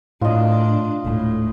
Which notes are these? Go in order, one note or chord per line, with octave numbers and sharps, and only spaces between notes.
A2 D4 F4 D#5
D#1 A2